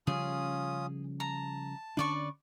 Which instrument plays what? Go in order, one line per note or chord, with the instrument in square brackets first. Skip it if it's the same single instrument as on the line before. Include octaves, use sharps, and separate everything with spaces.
[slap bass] C#3 F3 G3 [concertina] C#4 F4 D#6 [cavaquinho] G#4
[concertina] A5 [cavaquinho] A#5
[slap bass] D3 C#4 D4 [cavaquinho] B4 D5 C#6